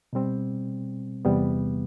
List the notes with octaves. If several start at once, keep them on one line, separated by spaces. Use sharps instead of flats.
B2 G3 C4
E2 C3 G3 B3